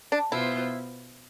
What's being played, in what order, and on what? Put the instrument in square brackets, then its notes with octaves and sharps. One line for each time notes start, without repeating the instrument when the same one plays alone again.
[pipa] D4
[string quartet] B2 B3 F4 C5 [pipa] E4